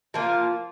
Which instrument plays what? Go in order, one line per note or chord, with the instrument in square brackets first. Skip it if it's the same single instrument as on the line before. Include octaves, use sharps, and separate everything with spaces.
[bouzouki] F3 A#3 F4